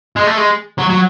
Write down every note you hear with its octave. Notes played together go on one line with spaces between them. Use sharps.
G#3
A3
G#3
F#3
F#3